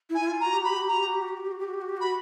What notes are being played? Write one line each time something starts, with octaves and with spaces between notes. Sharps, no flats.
E4
G#5
E4
F4
A#5
F#4
G4
F#4
G4 B5
F#4
G4
F#4 A#5
G4
F#4
G4
F#4
G4
F#4
G4
F#4
G4
F#4
G4
F#4
G4
F#4 B5